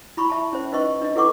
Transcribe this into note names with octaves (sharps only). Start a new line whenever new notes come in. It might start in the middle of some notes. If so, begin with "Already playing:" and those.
E4 B5 C#6
E5 A5
C#4 C5
D#4 B4 C5 D#5 C#6
D4 D#5
E4 A4 B4 F#5 C#6 D6